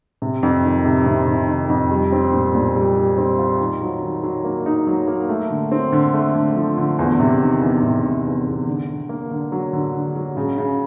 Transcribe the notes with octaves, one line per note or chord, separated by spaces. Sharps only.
C3
F2
D#3
C3
C3
C3
D#3
F2
G3
C4
A#2
A#2
G3
G3
C4
F4
D#3
F#3
D#3
F#3
A#3
D#4
F#3
A#3
A3
D3
C4
D3
A3
D3
F3
D3
E2
C3
D#3
E2
C3
C3
E2
E2
D3
D3
A#3
D3
F#3
D3
D3
F#3
C#3
C#3